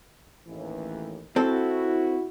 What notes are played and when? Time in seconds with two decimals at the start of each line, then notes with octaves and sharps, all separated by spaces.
0.47 A1 D#2 E3
1.36 C4 E4 F#4 A4